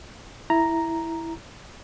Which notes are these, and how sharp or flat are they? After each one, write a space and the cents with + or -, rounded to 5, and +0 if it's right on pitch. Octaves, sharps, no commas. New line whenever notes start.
E4 +0 A#5 +0